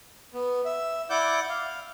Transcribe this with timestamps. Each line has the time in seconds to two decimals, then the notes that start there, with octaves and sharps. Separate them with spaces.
0.34 B3
0.65 E5
1.10 E4 D5 F#5 D6 G6
1.49 F5